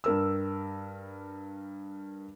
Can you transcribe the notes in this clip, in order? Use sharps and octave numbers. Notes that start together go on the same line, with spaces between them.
G2 A#4 E6